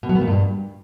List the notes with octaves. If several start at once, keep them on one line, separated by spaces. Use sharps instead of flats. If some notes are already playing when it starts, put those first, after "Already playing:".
B2
F#3
B3
A#2
G2